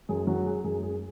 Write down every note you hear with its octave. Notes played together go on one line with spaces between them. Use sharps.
F#2 G#4
F#3 F#4
G#3 G#4
F#2 G#4
G#3 G#4